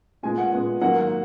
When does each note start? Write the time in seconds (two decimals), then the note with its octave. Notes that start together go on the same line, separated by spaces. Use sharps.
0.23 A#2 G#3 B3 G#5
0.38 F#5
0.53 A#2 G#3 B3
0.81 G#2 D#3 F#3 A#3 F#5